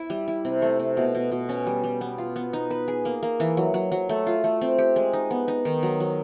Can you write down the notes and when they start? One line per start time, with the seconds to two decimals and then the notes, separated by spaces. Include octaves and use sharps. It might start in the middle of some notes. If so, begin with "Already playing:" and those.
Already playing: E4
0.10 G3
0.28 E4
0.45 C3
0.62 A3
0.79 C3
0.97 B2
1.15 B2
1.32 B2
1.49 C#4
1.67 G3
1.84 G3
2.01 B3
2.18 F4
2.36 B3
2.53 D#4
2.71 B4
2.88 G#4
3.05 A#3
3.23 A#3
3.40 E3
3.57 F#3
3.74 F#3
3.92 F#3
4.09 A3
4.27 F4
4.44 A3
4.61 C4
4.78 G4
4.96 G#3
5.13 D#4
5.31 B3
5.48 D#4
5.65 D#3
5.83 F#3
6.00 F#3